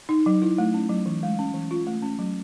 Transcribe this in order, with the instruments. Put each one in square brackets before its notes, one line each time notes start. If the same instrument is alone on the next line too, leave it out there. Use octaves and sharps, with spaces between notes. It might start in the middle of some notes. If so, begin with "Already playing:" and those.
[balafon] D#4
F#3
E4
A3
C#4
F#3
E3
G#3
C#4
E3
F4
A3
C#4
F#3